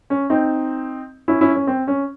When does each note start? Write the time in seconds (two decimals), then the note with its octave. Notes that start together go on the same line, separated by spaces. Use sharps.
0.10 C#4
0.30 C4 D#4
1.28 C#4 E4
1.41 C#4 E4
1.55 C#4
1.67 C4
1.87 C#4